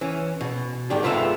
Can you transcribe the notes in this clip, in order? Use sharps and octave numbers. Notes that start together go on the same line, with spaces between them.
E3 C#4
B2
G#2 D#3 D4 G4
G#2 B3 F4 A4 B4 E5